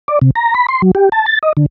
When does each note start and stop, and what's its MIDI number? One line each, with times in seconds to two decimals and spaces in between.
0.08 0.19 74
0.22 0.31 48
0.36 0.54 82
0.55 0.66 83
0.69 0.82 84
0.82 0.91 54
0.95 1.09 67
1.12 1.26 81
1.26 1.39 93
1.43 1.53 75
1.57 1.66 50